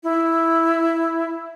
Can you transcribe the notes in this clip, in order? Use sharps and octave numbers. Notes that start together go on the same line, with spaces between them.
E4